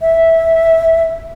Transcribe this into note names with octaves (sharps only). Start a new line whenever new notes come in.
E5